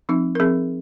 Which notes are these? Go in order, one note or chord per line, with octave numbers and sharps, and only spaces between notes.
F3 C4 D#4
A#4
F3 C4 G#4